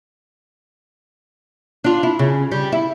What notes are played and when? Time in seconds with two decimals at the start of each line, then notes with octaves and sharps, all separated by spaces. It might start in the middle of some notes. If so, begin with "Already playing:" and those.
1.84 D4 F4
2.03 E4
2.19 C#3
2.52 G3
2.72 E4